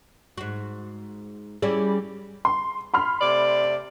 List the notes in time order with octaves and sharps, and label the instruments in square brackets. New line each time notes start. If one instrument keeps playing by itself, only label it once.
[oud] G#2 F#4
[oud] G3 C#4 E4 [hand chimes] G#4
[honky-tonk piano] C6
B5 C6 F6
[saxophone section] C3 A3 D5